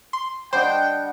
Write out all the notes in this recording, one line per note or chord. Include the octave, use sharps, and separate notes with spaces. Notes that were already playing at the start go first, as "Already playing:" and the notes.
C6
G3 D4 C5 D#5 F#5 G5